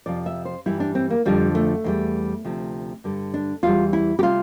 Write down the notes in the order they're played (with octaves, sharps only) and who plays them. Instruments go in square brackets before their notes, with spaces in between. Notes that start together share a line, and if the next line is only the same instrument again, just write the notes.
[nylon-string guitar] F2 C3 F3 D5
E5
C5
G2 E3 G3 E4
D4
C4
A#3
F2 D3 F3 G3
A3
E2 E3 G3
D2 C3 F3
G2 D3 G3
D4
E2 E3 G3 F4
E4
G4
C3 G3 F4